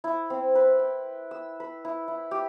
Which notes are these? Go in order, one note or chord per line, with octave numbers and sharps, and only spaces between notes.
E4
C4
B4
G5
E6
B4
E4
E4
G4